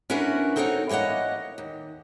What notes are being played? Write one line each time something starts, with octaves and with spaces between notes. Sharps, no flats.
C#4 D4 E4 F#4 A#4 B4
C4 D#4 A4 A#4 C#5 F#5
E3 A#3 C#5 D#5 F#5
D#2